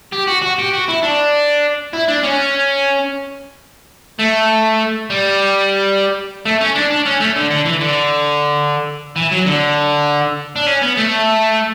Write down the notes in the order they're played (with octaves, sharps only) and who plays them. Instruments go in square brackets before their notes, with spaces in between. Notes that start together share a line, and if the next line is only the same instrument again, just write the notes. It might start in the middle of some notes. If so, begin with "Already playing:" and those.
[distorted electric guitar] G4
F#4
F#4
G4
F#4
E4
D4
E4
D4
C#4
A3
G3
A3
C#4
D4
D4
C#4
A3
D3
D3
E3
D3
E3
F#3
D3
D4
C#4
B3
A3